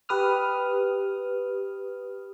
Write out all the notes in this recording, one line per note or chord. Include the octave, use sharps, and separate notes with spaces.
G4 B4 D#6 F6